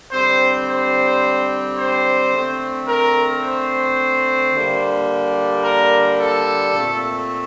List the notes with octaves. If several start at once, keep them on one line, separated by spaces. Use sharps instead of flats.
D3 G3 C4 C5
C5
C5
D3 A3 C4
A#4
C5
D3 G3 A#3
A#4
A4
A#2 A3 C4